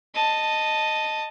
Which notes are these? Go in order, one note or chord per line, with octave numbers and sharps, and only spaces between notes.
D#5 A5